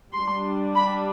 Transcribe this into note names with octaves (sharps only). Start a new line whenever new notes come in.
G3 D4 C6
B5